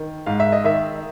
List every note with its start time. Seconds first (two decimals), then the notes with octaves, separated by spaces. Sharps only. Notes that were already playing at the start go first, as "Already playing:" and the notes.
Already playing: D#3
0.26 G#2 F5
0.40 E5
0.52 D#5
0.64 D#3 E5